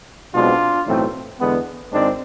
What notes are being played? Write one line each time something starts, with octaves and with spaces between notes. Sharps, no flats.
B1 B2 G#3 C4 D4 F4
B1 A2 E3 A3 C4
E2 D3 G#3 B3
G#1 G#2 G#3 C4 D4